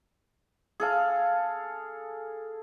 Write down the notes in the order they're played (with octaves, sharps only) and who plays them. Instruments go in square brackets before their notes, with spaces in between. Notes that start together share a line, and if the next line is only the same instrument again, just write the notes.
[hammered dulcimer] G#4 A4 F5